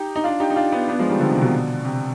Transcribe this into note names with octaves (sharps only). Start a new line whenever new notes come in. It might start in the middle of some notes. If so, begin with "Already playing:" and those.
Already playing: D#4 G4
D#4
D4 F4
D#4 G4
D#4
D4 F4
B3 D4
B3 D4
F3 G#3
D#3 G3
D3 F3
C3 D#3
B2 D3
C3